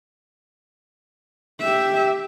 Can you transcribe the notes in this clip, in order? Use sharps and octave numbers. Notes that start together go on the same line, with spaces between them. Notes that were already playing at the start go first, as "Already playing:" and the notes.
G4 E5